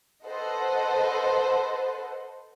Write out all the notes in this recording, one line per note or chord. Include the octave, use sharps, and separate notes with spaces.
A4 B4 C5 D#5 F#5